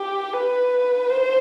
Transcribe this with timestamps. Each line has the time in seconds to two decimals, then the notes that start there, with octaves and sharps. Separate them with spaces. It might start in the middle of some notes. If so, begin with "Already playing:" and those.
Already playing: G4
0.34 B4
1.10 C5